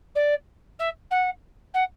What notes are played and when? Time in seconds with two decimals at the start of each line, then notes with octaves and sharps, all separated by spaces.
0.15 D5
0.79 E5
1.10 F#5
1.74 F#5